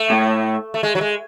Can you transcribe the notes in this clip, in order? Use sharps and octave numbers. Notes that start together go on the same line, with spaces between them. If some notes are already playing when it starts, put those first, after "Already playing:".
Already playing: A3
A2
A3
G#3
F#3
G#3